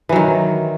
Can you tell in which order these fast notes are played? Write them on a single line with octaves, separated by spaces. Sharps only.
E3 F#3 D#3